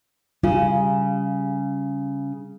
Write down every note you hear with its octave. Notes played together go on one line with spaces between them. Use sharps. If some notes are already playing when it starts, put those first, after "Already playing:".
C#3 G3 F4